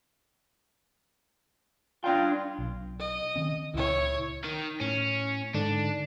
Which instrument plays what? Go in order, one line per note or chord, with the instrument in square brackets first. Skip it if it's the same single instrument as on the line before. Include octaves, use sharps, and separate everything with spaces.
[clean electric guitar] D4 D5 G5 [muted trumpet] F4
[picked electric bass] B1
[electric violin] D#5
[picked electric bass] D#3 C4 C#4
[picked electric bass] C#2 A#2 [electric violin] E4 C#5
[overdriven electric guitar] D#3
[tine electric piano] A2 [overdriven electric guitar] C#4
[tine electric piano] G#2 D3 [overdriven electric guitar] D4